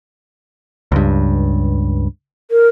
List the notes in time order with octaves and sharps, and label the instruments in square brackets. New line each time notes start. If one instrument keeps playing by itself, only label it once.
[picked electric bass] C#2 G2
[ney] A#4